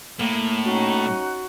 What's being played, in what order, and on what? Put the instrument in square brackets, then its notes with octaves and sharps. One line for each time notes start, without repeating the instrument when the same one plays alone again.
[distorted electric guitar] A2 [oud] A#3
[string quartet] C#4 D#4 [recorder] F#4